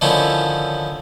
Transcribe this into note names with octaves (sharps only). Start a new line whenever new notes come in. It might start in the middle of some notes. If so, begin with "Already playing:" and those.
D3 D#3 F3 C#4 D#4 E4